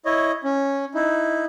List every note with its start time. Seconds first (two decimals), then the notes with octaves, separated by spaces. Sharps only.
0.06 E4 C#5 D#5
0.44 C#4
0.94 D#4 E4